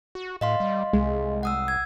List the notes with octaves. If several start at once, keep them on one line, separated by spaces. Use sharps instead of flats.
F#4
A2 D#5 F5 C6
G3
C2 G#3
F#5 D#6 E6
G#6